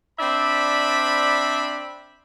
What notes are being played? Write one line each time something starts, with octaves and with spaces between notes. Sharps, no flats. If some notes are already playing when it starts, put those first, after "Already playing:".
C4 D4 D5 E5 B5